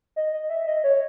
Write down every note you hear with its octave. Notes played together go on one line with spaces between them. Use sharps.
D#5
D#5
E5
D#5
C#5